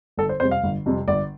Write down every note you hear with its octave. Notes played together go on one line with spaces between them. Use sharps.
G1 A4
C5
F2 C3 G3 C5
F5
G1
F2 C3 G3
G1 D5